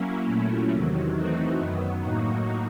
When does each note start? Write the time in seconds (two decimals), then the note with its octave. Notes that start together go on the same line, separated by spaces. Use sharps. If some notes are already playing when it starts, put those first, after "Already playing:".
Already playing: F#3 A#3 C#4 E4
0.25 A#2 F#3 A3 C#4 E4
0.69 E2 C3 D#3 F#3
1.13 E3 A3 C4 D#4 F#4
1.57 F#2 D#3 F#3 B3
2.01 A2 F#3 A#3 D#4 F#4